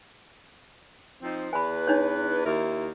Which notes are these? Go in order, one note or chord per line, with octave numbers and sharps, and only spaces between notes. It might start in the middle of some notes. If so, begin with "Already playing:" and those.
F3 C4 D#4
E2 B4 G#5 B5
D4 D#4 C#5
D#2 E4 A#4